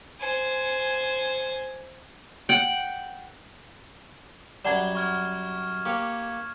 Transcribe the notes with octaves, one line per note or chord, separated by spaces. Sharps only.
C5 G#5
F#5 G5
F#2 F#3 G3 D5 F#5 A5 G#6 E7
C#6 F6 G#6
A#3 G4 C#5